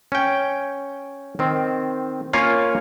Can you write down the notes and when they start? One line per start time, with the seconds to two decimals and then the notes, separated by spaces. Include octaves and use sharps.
0.12 C#4 G5
1.39 D#3 C4
2.33 A#3 C#4 F4 C#5 F5 G#5